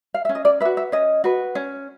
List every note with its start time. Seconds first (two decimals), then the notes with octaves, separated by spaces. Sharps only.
0.14 F5
0.25 C#4 E5
0.35 D#5
0.45 D5
0.60 B4 E5
0.65 F#4
0.77 E5
0.92 C#4 D#5
1.24 F#4 B4
1.55 C#4